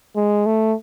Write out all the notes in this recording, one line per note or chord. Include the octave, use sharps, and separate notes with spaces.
G#3
A3